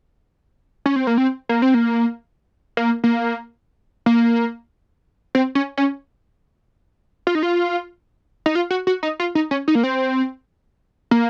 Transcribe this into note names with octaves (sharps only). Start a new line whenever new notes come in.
C#4
C4
A#3
C4
A#3
C4
A#3
A#3
A#3
A#3
C4
C#4
C#4
F4
D#4
F4
D#4
F4
F#4
F#4
D#4
F4
D#4
C#4
D#4
A#3
C4
A#3